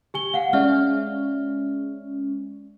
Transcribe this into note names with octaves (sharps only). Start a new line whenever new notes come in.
G4 G#5 G7
F5 F#5
G#3 C#4 D5 E5 F6